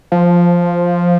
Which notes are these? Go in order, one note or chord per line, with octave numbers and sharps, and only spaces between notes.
F3